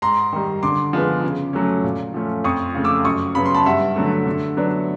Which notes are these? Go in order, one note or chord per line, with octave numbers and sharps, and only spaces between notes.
G#2 A#5 C6
D#3 G3
D3 C6 D6
F3 G#3 B3
C#3
F#3 A3 C#4
A#2
F3 A3 C#4
F2 C#6 D#6
C#3 F3 A3
D6 E6
F#2 C#6 D#6
C#3 F#3 B3 B5
C6
A5 B5
G2 E5 F#5
D3 F#3 A3
D3
F#3 B3 D4